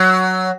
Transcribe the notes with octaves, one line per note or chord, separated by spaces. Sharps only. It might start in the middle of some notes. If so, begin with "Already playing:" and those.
Already playing: F#3